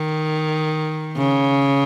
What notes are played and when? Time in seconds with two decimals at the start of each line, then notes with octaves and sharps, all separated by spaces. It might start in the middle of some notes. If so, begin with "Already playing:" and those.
Already playing: D#3
1.17 C#3